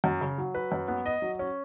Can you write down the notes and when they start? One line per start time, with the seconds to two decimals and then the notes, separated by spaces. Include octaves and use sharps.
0.04 F#2
0.21 C#3
0.38 F#3
0.55 B4
0.72 F#2
0.88 B3
1.06 D#5
1.22 F#3
1.39 C#4